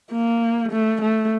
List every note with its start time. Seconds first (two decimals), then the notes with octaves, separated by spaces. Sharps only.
0.11 A#3
0.72 A3
1.02 A3